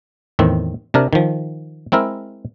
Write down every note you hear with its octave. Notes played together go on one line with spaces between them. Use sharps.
E2 A2 D#3 C4
C3 D4 A#4
D#3 F3
G#3 C4 E4 A#4